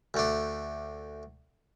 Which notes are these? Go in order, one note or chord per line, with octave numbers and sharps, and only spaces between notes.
D2 A3 D4